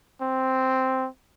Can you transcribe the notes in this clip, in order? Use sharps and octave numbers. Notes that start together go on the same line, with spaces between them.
C4